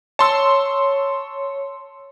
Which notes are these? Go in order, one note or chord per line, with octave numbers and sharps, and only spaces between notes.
C#5 A5 C6 E6